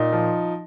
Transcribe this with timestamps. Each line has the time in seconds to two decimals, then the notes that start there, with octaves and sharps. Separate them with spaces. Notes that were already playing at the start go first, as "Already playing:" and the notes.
Already playing: A#2 D#4
0.13 F3